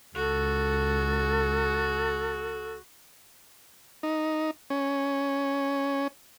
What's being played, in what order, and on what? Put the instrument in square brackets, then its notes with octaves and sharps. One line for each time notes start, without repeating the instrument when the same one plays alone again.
[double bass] C#2 [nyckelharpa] F#4 [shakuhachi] A4
[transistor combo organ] D#4
C#4